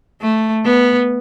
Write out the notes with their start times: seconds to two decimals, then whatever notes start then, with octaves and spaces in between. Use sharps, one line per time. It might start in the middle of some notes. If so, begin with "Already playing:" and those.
0.21 A3
0.65 B3